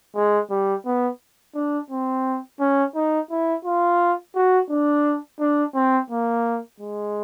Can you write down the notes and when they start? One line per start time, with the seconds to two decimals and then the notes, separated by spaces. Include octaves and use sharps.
0.15 G#3
0.50 G3
0.85 B3
1.55 D4
1.90 C4
2.60 C#4
2.95 D#4
3.31 E4
3.65 F4
4.35 F#4
4.70 D4
5.40 D4
5.75 C4
6.10 A#3
6.80 G#3